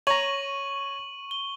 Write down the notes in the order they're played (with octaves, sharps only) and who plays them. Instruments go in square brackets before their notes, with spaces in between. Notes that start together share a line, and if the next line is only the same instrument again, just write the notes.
[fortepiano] C#5 A#5 [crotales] C#6 D#7 F#7
[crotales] G7